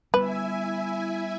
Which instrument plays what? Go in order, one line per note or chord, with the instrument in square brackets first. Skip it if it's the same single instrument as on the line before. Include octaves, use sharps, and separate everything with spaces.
[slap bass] G3 B3 [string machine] E4 E5 G#5 [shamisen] B4